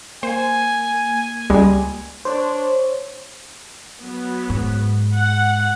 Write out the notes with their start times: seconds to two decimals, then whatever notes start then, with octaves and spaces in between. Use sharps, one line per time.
0.23 A#3 C5 G#5
1.50 C#2 G3 G#3
2.25 D4 C5 C#5
4.01 F#3 B3
4.49 G#2
5.15 F#5